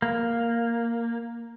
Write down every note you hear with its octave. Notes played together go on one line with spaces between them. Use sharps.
A#3